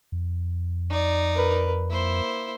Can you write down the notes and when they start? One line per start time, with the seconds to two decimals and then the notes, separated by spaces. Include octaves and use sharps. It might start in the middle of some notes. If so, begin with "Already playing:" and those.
0.12 F2
0.90 D#4 D5
1.35 A#4 B4
1.90 A#3 E4 C5